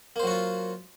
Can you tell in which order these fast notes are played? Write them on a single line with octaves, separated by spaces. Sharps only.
A#3 C5 F#3 F#4 F4